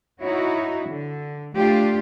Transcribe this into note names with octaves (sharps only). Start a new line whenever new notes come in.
D#4 E4 F#4 C#5
D3
A3 D4 F4 G4